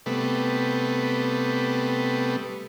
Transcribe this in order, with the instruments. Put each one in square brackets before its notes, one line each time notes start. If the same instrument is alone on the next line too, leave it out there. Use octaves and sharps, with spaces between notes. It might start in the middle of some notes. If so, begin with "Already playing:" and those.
[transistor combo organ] C3 G3 A3 B3